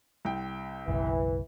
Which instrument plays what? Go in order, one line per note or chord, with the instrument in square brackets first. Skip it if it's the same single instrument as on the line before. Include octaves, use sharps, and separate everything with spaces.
[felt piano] C2 G5
[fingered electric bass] F#1 B1 [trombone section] E3